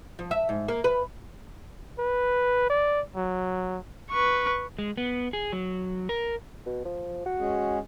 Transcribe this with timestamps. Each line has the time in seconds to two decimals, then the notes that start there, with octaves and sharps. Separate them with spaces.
0.19 F3
0.31 E5
0.49 G#2
0.68 A#3
0.84 B4
1.98 B4
2.69 D5
3.15 F#3
4.11 B4 C#6
4.79 G#3
4.97 B3
5.33 G#4
5.52 F#3
6.09 A#4
6.66 B2
6.85 F3
7.26 F#4
7.39 G#3 C#4 G#4